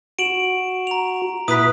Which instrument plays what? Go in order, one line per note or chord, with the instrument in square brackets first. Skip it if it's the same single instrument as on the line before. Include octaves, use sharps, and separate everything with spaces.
[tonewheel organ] F#4 [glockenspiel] D7 E7 F#7
[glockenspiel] A#5 F7
[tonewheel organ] A#2 E4 [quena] B4 [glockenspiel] D#6 B6